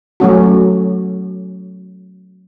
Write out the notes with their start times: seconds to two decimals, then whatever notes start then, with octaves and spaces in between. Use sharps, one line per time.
0.20 F#3 A3 C#4 F#4